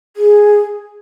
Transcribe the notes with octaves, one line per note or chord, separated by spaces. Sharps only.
G#4